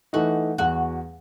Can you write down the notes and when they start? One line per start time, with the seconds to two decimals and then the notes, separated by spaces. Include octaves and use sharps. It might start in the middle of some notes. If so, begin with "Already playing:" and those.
0.13 E3 A3 D#4 F#4
0.58 E2 F#4